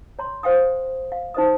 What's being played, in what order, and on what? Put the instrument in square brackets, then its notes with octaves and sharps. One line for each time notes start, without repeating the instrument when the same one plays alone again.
[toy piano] C#5 A#5 C6
C5 F5 G5 D#6
F5
D#4 C5 D#5 D#6